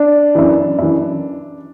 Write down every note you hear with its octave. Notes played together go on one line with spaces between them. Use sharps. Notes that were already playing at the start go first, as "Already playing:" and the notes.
Already playing: D4
F#2 E3
F#2 E3